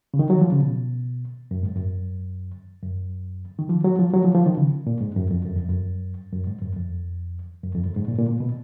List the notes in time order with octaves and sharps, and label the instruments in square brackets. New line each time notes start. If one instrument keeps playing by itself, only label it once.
[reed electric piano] C#3
D#3
F#3
F3
C#3
B2
F#2
G#2
F#2
F#2
D#3
F3
F#3
F3
F#3
F3
F3
D#3
C#3
A#2
G#2
F#2
F2
F#2
F2
F#2
F#2
G#2
F#2
F2
F#2
F2
F#2
G#2
A#2
A#2
A#2
B2